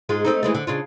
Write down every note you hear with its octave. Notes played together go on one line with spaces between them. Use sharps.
G#2 G#3 F4
A3 C4 D#4
E3 G#3 A3
D3
C#3 D4 F4